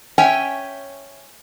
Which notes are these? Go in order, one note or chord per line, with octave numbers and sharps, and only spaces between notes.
C#4 C#5 E5 G5 G#5